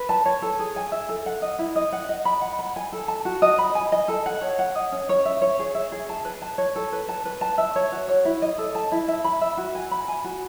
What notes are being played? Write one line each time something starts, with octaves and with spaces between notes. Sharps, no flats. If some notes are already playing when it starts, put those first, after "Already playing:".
Already playing: B4
A5
C#5
A4
G#4
G#5
E5
A4
F#5
D#5
E4
D#5
F#5
D#5
B5
F#5
B5
G#5
A4
A5
F#4
D#5
B5
G#5
D#5
A4
F#5
C#5
F#5
D#5
C#4
C#5
E5
C#5
G#4
E5
G#4
A5
B4
A5
C#5
A4
B4
A5
B4
A5
E5
C#5
F#4
C#5
E4
D#5
A4
A5
E4
E5
B5
E5
F#4
G#5
B5
G#5
F#4